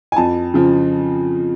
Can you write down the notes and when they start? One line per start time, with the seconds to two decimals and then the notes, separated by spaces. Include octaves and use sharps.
0.12 G#5
0.16 F2 A5
0.54 C#3 F3